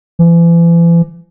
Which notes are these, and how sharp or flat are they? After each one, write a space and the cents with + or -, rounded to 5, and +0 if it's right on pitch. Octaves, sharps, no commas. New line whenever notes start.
E3 +40